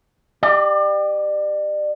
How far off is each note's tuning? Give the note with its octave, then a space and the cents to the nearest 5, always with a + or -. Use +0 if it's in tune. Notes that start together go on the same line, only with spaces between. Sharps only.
G4 +0 D5 +35